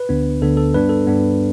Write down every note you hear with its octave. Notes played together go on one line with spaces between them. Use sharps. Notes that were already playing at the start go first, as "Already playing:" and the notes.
Already playing: B4
D2 D3 B3 D4
D2 D3 B3 D4 A4
A4
G2 G3 B3 D4 B4
A4
G2 G3 B3 D4